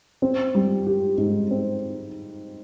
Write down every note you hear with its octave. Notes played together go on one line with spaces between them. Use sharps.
C4
G3
G4
G#2
C4